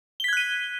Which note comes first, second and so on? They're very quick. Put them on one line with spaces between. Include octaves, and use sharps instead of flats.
G7 B6 G#6 F#6 D#7